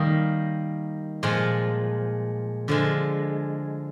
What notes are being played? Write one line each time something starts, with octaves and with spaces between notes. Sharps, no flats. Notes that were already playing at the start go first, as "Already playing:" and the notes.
Already playing: D#3 G3 A#3 D#4
A#2 F3 G#3
D3 F3 G#3